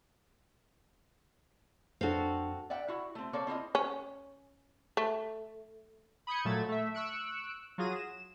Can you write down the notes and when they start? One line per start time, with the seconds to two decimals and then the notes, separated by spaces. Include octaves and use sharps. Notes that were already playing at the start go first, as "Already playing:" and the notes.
2.01 F2 C4 D4 F#4 A4 F5
2.70 D5 E5 F#5 G5
2.88 E4 F#4
3.15 A3 C4
3.33 A#3 C4 A4 C#5 D5
3.47 C4 E4 F4 D#5
3.75 C#4
4.97 A3
6.27 B5 D#6 G6 G#6 C#7
6.45 A#2 F#3 A3 E6 G#6 A6
6.69 A3 E5
6.94 C#6 E6 F#6 C#7 D7
7.78 F#3 F4 G#4 A#6 D#7
7.96 E7